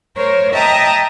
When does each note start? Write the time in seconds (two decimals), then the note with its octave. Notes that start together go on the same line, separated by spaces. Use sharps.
0.16 A#4 C5 C#5
0.53 D#5 E5 G5 A5 A#5 D#6